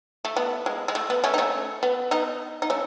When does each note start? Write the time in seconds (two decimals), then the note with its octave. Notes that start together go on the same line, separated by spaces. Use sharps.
0.25 A3
0.37 B3
0.66 G#3
0.88 G#3
0.95 A3
1.10 B3
1.24 A3 C#4
1.34 D#4
1.38 A3 C#4
1.83 B3
2.11 B3 D#4
2.62 D#4
2.70 A3 C#4